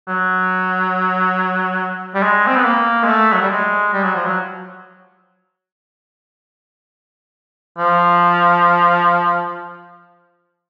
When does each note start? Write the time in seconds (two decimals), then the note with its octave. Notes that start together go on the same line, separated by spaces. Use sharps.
0.08 F#3
2.15 G3
2.23 G#3
2.47 C4
2.56 B3
2.65 A#3
3.03 G#3
3.08 A3
3.33 F#3
3.42 G3
3.50 G#3
3.93 G3
4.03 F#3
4.15 F3
4.25 F#3
7.78 F3